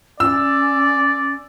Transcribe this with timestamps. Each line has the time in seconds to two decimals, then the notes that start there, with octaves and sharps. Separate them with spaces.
0.20 C#4 D5 E6